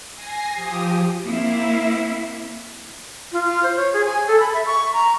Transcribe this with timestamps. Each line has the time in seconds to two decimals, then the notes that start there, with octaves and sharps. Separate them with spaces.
0.14 G#5 A#6 C7
0.54 F3 G4 D#6
1.26 A#3 C4 E4 F5
3.33 F4
3.44 F4
3.63 C5
3.76 C#5
3.93 G#4
4.05 G#5
4.27 A4
4.40 B5
4.54 E5
4.66 C#6
4.93 A#5